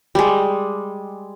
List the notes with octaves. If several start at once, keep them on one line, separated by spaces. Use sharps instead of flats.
G3 G#3